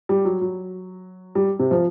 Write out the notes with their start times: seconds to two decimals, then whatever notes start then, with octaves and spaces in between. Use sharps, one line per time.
0.09 G3
0.25 F#3
0.41 F#3
1.35 G3
1.59 C3
1.71 F3